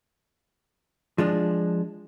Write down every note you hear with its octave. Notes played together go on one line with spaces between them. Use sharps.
F3 G#3 D4